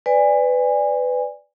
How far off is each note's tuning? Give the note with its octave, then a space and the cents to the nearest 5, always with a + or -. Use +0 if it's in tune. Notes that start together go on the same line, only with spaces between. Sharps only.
B4 +20 D5 +0 G#5 -25